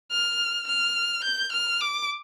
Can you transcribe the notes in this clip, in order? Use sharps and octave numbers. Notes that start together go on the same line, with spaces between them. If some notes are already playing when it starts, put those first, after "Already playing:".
F6
F6
G6
F6
D6